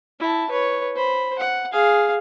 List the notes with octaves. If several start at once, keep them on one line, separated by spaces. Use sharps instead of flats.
E4 A5
B4 C#5
C5 B5
F#5
G#4 F5